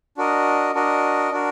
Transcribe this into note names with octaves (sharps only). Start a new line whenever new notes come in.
D4 F#4 A#4 D#5
D4 F#4 A#4 D#5
D4 F#4 A#4